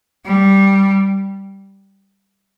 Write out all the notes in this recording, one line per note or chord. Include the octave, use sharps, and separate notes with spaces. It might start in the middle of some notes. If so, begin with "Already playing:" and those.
G3